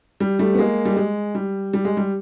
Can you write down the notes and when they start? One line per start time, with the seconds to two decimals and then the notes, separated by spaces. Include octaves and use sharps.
0.20 G3
0.39 G3 A3
0.55 B3
0.58 G#3 A#3
0.85 G3
0.97 G#3
1.35 G3
1.73 G3
1.85 G#3
1.97 G3